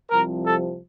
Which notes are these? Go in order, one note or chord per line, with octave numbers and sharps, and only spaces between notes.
C2 C3 F3 A#4
A4